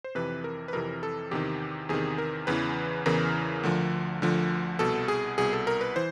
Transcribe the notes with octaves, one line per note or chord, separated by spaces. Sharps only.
C5
F2 C3 E3 B4
A#4
B4
F2 C3 E3 A#4
A4
E2 C3 D#3 G4
E2 C3 D#3 G#4
A#4
E2 C#3 E3 B4
E2 C#3 E3 A#4
D2 D3 F3
D2 D3 F3
C2 B2 A4
G#4
C2 B2 G#4
A4
A#4
B4
E3 C5